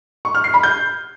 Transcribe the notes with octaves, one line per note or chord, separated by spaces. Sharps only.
C#6
F6
C7
B5
G6